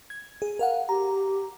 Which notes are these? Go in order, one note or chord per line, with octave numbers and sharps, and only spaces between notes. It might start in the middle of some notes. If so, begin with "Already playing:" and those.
G#6
G#4
A#4 F5 F#5
G4 A#5